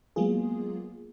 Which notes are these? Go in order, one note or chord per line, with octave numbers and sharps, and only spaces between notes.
F#3 G#3 A#3 B3 F4 G#4